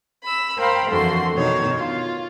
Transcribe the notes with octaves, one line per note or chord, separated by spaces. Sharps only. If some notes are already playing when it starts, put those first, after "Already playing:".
B5 E6
A#4 C5 F5 G5 B5
F2 D3 E3 F#4 A4 C6
B2 D#3 D4 C#5
F4